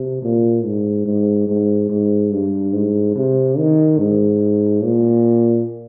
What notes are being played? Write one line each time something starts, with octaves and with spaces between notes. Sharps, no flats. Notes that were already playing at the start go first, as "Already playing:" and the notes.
Already playing: C3
A#2
G#2
G#2
G#2
G#2
G2
G#2
C3
D#3
G#2
A#2